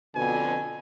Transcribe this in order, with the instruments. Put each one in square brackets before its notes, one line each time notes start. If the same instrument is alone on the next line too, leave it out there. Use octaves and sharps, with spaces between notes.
[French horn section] F2 B2 D3 [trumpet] G#5